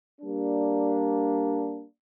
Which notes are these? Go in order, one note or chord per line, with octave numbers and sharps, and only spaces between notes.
G3 A#3 D4